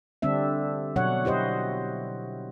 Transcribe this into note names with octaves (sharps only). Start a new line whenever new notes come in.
D3 G3 C4 D4 E5
B2 F#3 D4 C#5 F#5
E4 G4 C5 D#5